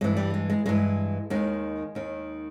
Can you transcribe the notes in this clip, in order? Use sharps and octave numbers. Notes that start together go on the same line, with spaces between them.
G2 E3 G#3
G3
G#3
G#3
G2 E3 G#3
D#2 D#3 G#3
D#2 D#3